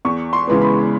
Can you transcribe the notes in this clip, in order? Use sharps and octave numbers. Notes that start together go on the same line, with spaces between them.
E2 C#6
C6
C#3 E3 G#3 B3
B5